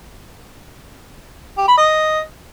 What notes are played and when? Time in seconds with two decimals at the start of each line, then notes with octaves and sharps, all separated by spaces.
1.58 G4
1.68 B5
1.78 D#5